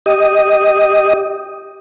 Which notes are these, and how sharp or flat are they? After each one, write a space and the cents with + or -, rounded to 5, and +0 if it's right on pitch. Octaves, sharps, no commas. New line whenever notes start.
G4 +0 D#5 +0